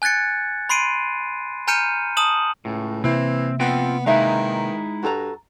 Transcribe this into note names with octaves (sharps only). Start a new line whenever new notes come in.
G#5 F#6 G#6 A6 C#7
B5 C6 C7 D7 D#7
G#5 A#5 F6 G6 C#7 D#7
A5 D#6 E7 F#7
C#2 A2
C3 E3 A#3 C4 E4
B3 C4 F4 G5
D#3 G#3 D#4 E4 B4 E5 F5
G2 F#4 A4 A#5